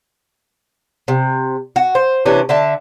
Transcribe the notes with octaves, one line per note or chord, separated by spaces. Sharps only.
C3
F#4
C5
C3 E3 C#4 D4
D3 E5 A5